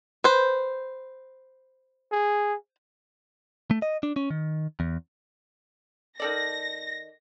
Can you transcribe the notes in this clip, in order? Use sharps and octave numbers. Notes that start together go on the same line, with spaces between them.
B4 C5
G#4
A3
D#5
D4
C#4
D#3
E2
D#3 A4 D5 A#6